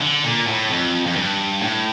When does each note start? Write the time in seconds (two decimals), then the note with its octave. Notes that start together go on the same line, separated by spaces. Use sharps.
0.01 D3
0.24 A#2
0.47 A2
0.70 F2
1.06 F2
1.16 G2
1.62 A2